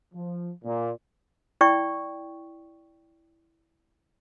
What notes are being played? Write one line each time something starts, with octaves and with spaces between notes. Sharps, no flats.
F3
A#2
E4 D5 G5 C#6